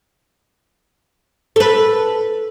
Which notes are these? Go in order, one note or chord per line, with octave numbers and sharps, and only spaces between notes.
A4 B4